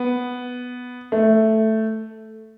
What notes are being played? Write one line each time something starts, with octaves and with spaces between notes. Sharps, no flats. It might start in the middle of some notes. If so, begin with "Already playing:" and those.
Already playing: B3
A3